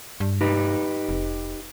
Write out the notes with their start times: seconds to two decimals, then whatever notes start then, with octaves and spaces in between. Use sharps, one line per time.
0.20 G2
0.41 D#4 G4 B4
1.09 F1